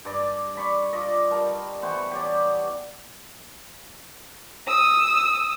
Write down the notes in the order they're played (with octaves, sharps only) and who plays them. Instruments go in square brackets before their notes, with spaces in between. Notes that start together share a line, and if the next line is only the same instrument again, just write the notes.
[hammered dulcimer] G2 D5
D5 B5 C#6
F4 D5 D#5
G3 A#4 A5
E3 B3 C5 C#6
G4 C#5 D5
[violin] D#6 E6